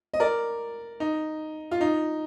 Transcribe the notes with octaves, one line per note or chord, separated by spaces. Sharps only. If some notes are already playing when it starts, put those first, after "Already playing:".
D#5
A#4 D5
D#4
F4
D#4